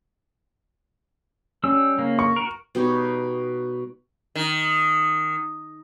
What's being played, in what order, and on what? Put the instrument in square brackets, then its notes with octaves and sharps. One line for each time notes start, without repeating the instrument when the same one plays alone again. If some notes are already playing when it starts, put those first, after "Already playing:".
[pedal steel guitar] G3 E6 [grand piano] C#4
[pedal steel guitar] C#3 A#3
[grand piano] C#6
[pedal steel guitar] F#4 A#4
[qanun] B2 G3 D#4 C#5
[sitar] D#3